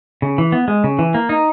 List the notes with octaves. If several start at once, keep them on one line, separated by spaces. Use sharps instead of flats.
C#3
E3
B3
G#3
C#3
E3
A#3
D#4